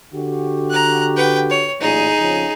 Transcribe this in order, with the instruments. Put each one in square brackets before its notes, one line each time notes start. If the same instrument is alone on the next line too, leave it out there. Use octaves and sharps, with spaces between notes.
[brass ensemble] D3 F#4 G4
[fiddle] A#5 F#6
B4 G5
C#5
[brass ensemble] A1 F#2 A#2 [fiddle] D#4 G#4
[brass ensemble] F2 C#3